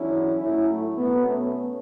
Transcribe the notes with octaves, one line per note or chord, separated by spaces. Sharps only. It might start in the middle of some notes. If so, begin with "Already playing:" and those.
Already playing: E2 D3 F#3 C#4 E4
A2 F#3 C#4 E4
A3
B2 F#3 B3
A3 C#4